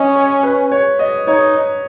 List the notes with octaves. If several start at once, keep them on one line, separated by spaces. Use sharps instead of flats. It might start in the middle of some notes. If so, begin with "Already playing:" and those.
Already playing: C#4 D#5
C#5
B4
C#5
D#5
D#4 C#5